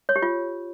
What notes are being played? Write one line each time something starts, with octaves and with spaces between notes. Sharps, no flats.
C#5
G4
F4